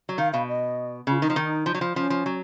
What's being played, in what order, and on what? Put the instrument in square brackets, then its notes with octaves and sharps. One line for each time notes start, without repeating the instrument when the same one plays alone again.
[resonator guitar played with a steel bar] F#3
[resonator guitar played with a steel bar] D#3 [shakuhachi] F5
[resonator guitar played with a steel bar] B2 [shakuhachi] F5
[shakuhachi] D#5
[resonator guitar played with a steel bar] C#3 [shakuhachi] F4
[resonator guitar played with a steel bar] D#3 [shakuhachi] D#4
[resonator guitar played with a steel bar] F3
D#3
F3
F#3
F3
[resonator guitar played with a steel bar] F3 [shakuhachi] C#4
[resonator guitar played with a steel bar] F3
F#3